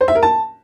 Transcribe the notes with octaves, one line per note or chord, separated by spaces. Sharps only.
C5
E5
A#4
A5